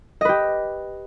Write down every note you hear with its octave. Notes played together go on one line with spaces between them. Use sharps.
G4 B4 D#5